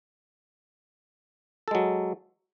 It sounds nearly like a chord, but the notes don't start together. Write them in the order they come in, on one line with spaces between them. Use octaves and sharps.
A4 G#3 F#3